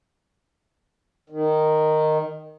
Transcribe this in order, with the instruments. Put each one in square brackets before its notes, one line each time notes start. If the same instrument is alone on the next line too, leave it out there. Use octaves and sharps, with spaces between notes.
[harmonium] D#3